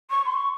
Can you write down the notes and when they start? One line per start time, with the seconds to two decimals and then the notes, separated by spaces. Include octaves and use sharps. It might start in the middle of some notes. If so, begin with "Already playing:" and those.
0.10 C#6
0.25 C6
0.37 C#6